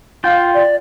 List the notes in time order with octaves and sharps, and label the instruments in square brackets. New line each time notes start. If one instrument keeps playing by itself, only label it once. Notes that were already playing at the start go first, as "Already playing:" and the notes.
[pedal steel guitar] F4 G5 [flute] F5
[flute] D5